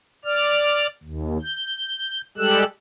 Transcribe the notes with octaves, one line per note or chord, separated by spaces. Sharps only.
D5 F6
D#2
G6
G3 G#3 G4 A4 E6 F#6